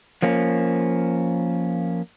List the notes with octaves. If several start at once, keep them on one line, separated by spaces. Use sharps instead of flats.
F3 A#3 C#4